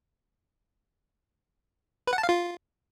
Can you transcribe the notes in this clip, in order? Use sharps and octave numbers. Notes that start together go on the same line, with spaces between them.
B4
F#5
A5
F5
F4